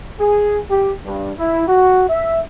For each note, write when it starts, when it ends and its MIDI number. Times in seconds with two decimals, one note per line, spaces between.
0.19 0.57 68
0.70 0.92 67
1.05 1.32 43
1.38 1.66 64
1.68 2.04 66
2.09 2.40 76